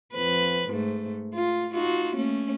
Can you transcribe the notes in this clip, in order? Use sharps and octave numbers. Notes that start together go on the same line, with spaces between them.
F2 B4
G#2 A3
F4
D#4 F4 F#4
A3 A#3 C#4